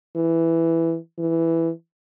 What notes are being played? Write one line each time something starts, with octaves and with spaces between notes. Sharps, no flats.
E3
E3